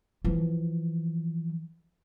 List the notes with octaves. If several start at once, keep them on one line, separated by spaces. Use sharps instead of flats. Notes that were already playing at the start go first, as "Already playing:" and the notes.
E3 F3